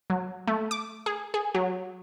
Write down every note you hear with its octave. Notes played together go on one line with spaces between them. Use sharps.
F#3
A3
D6
G#4
G#4
F#3